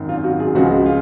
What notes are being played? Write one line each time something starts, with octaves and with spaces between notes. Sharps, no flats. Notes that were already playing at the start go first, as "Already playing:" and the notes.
Already playing: G#1 F#2 D#3
F4
F#4
F4 G#4
C#2 C#3 F3 G#3 F#4
F4